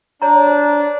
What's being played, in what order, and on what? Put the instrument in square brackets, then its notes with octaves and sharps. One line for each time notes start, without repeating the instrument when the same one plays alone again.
[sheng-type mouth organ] D4 [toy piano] C#5 A#5
[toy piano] C5